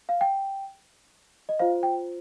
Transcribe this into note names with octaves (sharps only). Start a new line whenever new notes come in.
F5
G5
D#5
F4 C5 F5
G5